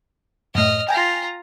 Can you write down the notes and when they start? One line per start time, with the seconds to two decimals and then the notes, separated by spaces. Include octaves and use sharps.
0.55 F#2 A2 D#5 F6
0.89 F4 G5 G#5 A#5 A#6